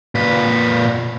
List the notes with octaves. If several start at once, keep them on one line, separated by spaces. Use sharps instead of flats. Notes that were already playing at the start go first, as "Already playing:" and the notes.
A#2 B4